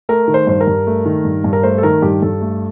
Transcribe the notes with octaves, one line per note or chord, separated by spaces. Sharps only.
A3 A#4
D#3
C5
G2 C5
A#4
G2
A3
D#3
G2
G2
A#4
A3 C5
A4
D#3 A#4
G2 G4
G2 A4
A3